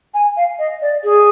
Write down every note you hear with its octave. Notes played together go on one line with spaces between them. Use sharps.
G#5
F5
D#5
D5
G#4